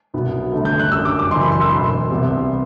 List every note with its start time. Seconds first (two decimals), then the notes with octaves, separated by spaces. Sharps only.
0.14 C2 B2 F#3 B3
0.52 G1 G2 D3 A3
0.65 G6
0.79 F#6
0.92 F#2 D3 G3 E6
1.05 D6
1.19 D6
1.31 F#1 F#2 E3 C6
1.42 B5
1.52 C6
1.61 E6
1.71 E1 D2 D3 C6
2.11 C2 C3 G3 B3